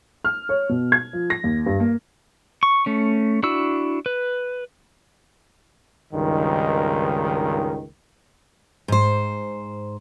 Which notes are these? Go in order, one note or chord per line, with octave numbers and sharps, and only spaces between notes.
F6
C#5
B2
G#6
F3
A#6
D#2
G2
A#3
C#6
A3 C#4
D4 E4 F#4 E6
B4
C#2 G2 D#3
G#2 C5